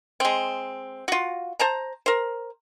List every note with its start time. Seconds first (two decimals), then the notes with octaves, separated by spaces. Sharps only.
0.20 G#3 C4
1.08 F4 F#4
1.59 C5 A5 A#5
2.06 A#4 C5